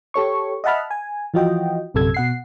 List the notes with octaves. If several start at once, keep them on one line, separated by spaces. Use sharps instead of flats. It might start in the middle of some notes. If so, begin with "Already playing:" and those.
G4 A4 C#5 C#6
D#5 E5 F#5 A5 B5 F6
G#5
E3 F3 F4 F#4 D#5 G5
A#1 F#2 C3 A4 E6 G#6
B2 F#5 C7